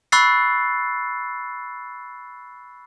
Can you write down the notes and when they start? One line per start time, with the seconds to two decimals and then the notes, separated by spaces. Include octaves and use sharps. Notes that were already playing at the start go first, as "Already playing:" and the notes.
0.12 B5 C#6 E6 F#6 A6 C7